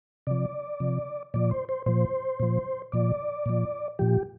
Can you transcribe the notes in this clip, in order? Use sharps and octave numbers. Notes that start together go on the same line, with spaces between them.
C3 F3 D5
C3 F3
A#2 F3 D5
C5
C5
A#2 F3 C5
A#2 F3
A#2 F3 D5
A#2 F3
A#2 F3 G4